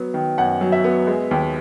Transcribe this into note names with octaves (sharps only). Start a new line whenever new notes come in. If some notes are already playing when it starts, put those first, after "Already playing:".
Already playing: F#3 B3
D#3
F#2 F#5
F#3
E5
B3
G#3
D#2